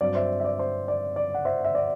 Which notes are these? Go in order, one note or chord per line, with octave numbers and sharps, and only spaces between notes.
G2 F#3 C4 D5
C5 E5
E5
D5
C5
D5
D5
F#5
C5 E5
E5
D5